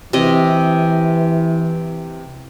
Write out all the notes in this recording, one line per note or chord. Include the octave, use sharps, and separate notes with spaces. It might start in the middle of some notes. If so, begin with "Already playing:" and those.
C3 E3 D#5